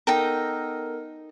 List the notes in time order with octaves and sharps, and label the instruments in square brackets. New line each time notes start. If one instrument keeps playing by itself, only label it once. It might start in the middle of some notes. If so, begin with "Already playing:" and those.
[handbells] B3 A4 A#4 [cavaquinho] D#4 G5 A#5